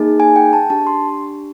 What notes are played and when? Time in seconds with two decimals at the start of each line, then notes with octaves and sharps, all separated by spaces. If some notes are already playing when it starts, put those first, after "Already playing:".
Already playing: A#3 D#4 G#4
0.20 G#5
0.36 G5
0.53 A5
0.70 D4 G4 A5
0.87 C6